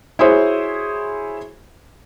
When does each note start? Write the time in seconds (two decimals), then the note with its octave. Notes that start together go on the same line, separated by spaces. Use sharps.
0.19 E4 F#4 G#4 C5 C#5